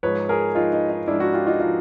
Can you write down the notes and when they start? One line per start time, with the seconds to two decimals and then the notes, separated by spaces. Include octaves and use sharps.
0.03 G#2 F3 B4 C#5
0.29 G#4 A#4
0.55 G#2 F3 D#4 F4
0.73 D#4
0.90 D#4
1.08 G#2 F3 D4 E4
1.20 E4 F#4
1.33 F4 G4
1.47 D#4 F4
1.60 F3 D#4 F4